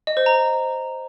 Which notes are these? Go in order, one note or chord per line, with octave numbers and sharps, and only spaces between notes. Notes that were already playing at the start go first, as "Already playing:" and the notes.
D#5
C5
A#5